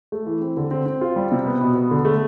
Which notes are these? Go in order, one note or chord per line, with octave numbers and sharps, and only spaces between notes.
A3
E3
C4
D3
C4
C4
F4
G3
C3
B3
B2
B3
D3
A3